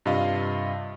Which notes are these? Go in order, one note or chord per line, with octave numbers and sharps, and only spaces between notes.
G2 C3 F4 D#5 F5